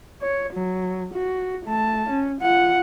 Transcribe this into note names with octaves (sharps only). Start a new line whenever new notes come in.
C#5
F#3
F#4
A3 A5
C#4
F4 F#5